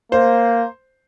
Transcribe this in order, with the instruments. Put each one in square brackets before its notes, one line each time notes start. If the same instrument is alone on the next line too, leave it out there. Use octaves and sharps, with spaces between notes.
[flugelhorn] A#3 [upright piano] C5